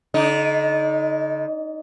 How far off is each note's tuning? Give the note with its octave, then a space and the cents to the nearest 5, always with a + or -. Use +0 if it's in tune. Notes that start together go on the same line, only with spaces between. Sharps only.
D3 -35 D#4 +0 D#5 +30